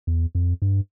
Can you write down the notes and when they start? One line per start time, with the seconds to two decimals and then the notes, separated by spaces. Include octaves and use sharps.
0.07 E2
0.35 F2
0.62 G2